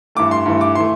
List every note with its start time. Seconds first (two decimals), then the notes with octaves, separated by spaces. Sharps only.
0.15 G2 E3 A3 D6
0.31 C6
0.46 G2 E3 A3
0.61 D6
0.75 E3 A3 C6